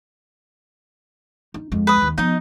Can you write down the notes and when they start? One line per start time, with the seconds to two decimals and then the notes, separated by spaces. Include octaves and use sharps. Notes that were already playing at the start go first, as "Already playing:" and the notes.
1.54 D#4
1.72 F2 G#3
1.87 B4 D#6
2.02 D#2
2.18 F3 B3 D#4 D#5